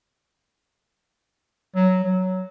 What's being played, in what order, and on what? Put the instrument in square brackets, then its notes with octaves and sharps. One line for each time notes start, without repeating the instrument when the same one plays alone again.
[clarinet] F#3
F#3